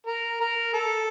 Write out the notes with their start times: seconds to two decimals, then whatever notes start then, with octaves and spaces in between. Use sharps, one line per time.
0.06 A#4
0.40 A#4
0.73 A4